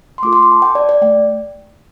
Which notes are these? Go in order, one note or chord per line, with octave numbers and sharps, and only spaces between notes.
C6
A3 F4 A4 D6
C6
D6
A5
G5
D5
D5
A3 G5